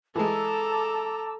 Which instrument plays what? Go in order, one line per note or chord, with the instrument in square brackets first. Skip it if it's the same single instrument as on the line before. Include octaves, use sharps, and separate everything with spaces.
[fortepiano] E3 G#3 [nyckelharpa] A4 A#5 [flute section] A5 D6 E6